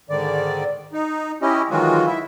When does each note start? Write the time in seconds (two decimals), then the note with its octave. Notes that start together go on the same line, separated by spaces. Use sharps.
0.10 G#2 D3 D#3 D5
0.93 D#4
1.42 C#4 E4 G4 D#5
1.71 D#3 E3 F#3 G#3 F4 F#4
2.06 E4 E5